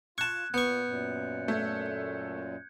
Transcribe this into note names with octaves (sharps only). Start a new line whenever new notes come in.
F4 A5 C#6 F#6 G#6
A#2 B3 C#6 G6 C#7
F#2 A#2
A3 G6 G#6